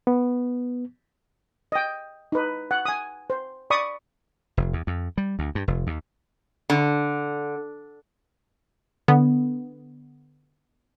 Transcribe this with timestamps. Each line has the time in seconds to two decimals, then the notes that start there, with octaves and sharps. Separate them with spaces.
0.07 B3
1.72 D#5 G5
2.32 D#4 B4
2.71 F#5
2.85 G#5 D#6
3.30 C5
3.70 D5 B5 C#6 D#6
4.57 F1
4.73 E2
4.87 F2
5.18 G3
5.39 D2
5.55 G2
5.68 F1
5.87 D#2
6.70 D3
9.08 D3 B3